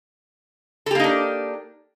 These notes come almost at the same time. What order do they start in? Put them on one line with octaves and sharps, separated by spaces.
A4 G4 A#3 D#4 D4